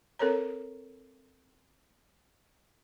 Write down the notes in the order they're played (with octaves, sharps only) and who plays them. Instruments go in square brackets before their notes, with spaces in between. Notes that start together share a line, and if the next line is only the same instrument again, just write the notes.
[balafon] C4 A4 A#4 C#5 A#5